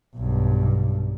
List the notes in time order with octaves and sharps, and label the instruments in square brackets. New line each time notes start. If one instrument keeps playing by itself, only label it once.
[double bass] B1 G2